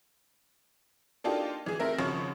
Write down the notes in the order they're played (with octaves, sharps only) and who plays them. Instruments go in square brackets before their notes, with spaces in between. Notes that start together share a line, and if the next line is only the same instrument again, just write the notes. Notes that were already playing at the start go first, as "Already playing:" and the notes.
[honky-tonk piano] A#3 D4 D#4 F4 G4 A4
E3 G#4
A3 C4 A#4 E5
G#1 C#3 F3 C#5